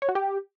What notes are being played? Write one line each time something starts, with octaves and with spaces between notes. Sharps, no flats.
C#5
F#4
G4